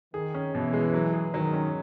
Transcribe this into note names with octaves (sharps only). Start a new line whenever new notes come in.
D#3 G#4
C#4
B2 E3
G#3
F#3
G#4
D#3 F#3
C#4